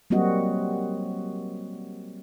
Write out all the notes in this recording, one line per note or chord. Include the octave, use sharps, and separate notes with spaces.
F#3 G3 A#3 C4 F#4 D#5